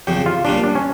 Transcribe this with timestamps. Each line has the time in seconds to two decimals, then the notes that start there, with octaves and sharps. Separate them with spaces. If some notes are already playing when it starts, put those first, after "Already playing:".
0.07 F2 C#3 F3 G4
0.26 F4
0.45 A#2 G3 C#4 D4 F4
0.63 D4
0.75 C#4